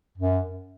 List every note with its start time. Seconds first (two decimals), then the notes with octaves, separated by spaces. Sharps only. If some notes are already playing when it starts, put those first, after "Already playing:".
0.18 F#2